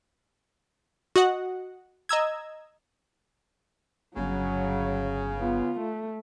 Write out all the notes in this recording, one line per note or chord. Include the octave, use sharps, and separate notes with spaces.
F#4 D#5 F#5
D#5 A#5 E6 G#6
G1 C#3 F#3
B3 F4
A3